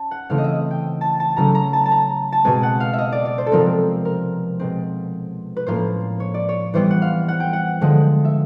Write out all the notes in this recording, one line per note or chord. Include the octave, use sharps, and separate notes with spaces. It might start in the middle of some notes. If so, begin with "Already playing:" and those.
Already playing: C#4 A5
F#5
C#3 E3 A3 C4 F5
D#5
E5
D#5
G5
A5
A5
C#3 F#3 A3 C#4 A#5
A#5
A5
A5
A#5
A5
B2 G#3 C4 G#5
F#5
F5
D#5 E5
D5
D5
C5
A4
C3 F3 G#3 C4 A#4
A#4
B2 G#3 C4
B4
A2 F3 A#3 C#4 C5
C#5
D5
C#5
E3 G3 B3 C5
F#5
F5
F#5
G5
F#5
D3 F3 G#3
E5